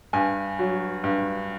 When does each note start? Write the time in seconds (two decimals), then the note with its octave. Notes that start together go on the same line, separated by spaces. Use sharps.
0.13 G2 G#5
0.59 F#3
1.04 G2